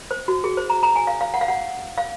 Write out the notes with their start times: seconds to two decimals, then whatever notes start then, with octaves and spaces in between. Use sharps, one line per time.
0.11 C5
0.28 F#4
0.44 G#4
0.57 C5
0.70 A#5
0.83 A#5
0.96 G#5
1.07 F5
1.21 F5
1.34 F#5
1.41 F5
1.48 F#5
1.98 F5